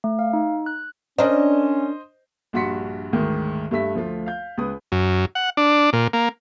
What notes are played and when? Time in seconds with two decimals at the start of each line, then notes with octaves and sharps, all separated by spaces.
0.04 A3
0.19 F5
0.33 D#4
0.66 F#6
1.18 C#4 D4 A#4 C5 D#5
2.53 A#1 G2 F#4 C6 B6 C#7
3.13 D2 G#2 D#3
3.71 G2 A3 E5 B6
3.95 D2 F3 A3 F4
4.26 F5 G6
4.58 C#2 B4 D#6
4.92 F#2
5.35 F#5
5.57 D4
5.93 A#2
6.13 A#3